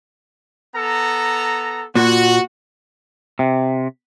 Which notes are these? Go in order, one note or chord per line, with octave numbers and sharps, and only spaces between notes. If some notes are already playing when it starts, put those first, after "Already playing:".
B3 A4 A#5
A#2 F#4
C3